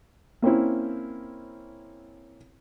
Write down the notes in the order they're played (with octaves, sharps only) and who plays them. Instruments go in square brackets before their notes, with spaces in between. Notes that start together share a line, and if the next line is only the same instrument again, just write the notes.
[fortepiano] A#3 C4 C#4 E4